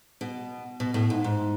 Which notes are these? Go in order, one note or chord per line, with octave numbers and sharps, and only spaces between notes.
B2
B2
A2
G#2
G#2